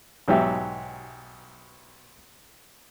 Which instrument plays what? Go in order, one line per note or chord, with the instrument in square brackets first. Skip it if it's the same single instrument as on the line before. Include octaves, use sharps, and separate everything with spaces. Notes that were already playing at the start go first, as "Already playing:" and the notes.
[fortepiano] B1 G#2 F#3 F#4 G4 E5